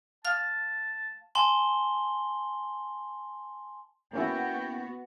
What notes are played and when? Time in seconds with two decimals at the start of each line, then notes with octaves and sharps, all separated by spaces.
0.25 F5 A5 F6
1.35 G#5 A5 C6 F#7 G7
4.13 A#3 B3 C#4 E4 F#4 G5